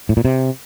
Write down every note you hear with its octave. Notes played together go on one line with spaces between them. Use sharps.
A2
A#2
C3